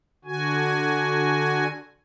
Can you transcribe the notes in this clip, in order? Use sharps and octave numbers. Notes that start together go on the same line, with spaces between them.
D3 F#4 G#5